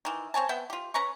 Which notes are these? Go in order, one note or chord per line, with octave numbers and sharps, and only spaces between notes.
D#3 E3
C4 C#5 G#5 A5
B3 E5 F#5 G5
F4 G4
C#4 B4 A#5 C#6